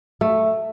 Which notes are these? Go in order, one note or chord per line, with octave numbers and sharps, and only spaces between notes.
A3